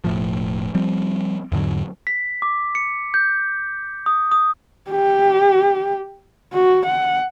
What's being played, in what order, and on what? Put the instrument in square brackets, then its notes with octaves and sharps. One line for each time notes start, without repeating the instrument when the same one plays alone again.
[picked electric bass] E1 A2 F3
F3 G3 C4
E2 G#2 D3 F#3
[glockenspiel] B6
D6
C#7
G6
D#6
D#6
[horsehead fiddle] G4
F#4
F#5